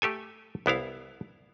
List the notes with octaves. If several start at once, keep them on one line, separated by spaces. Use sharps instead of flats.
A3 G4 A4 G#5
C2 B3 E4 F5